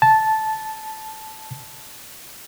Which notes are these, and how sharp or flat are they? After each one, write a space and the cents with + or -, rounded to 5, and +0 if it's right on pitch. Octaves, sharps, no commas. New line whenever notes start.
A5 -10